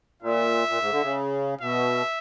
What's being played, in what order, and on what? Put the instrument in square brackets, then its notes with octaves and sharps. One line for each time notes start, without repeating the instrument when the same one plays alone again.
[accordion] A#2 [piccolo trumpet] E5
[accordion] A#2
G#2
D3
C#3
[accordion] B2 [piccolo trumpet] E5